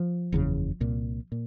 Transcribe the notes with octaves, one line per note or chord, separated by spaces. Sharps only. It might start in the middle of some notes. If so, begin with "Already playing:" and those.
Already playing: F3
F#1 E2 C#3
C2 A#2
A#2